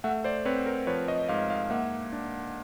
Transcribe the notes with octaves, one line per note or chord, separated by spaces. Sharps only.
A3 E5 F#5
C5 D5
C4 B4 C#5
A#4 C5
F3 B4 C#5
C#5 D#5
G#2 D#5 F5
D#5 F5
A#3 E5 F#5
D4